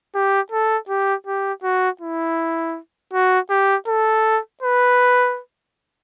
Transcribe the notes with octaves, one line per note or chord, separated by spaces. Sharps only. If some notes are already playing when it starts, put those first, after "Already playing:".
G4
A4
G4
G4
F#4
E4
F#4
G4
A4
B4